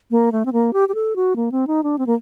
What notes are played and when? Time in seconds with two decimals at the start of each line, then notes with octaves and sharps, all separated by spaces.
0.11 A#3
0.32 A3
0.45 C4
0.53 A#3
0.73 G4
0.89 G4
0.95 A4
1.16 F#4
1.36 A#3
1.52 C4
1.67 D#4
1.83 D4
1.98 C4
2.07 A#3